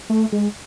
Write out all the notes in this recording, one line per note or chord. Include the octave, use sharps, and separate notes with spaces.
A3
G#3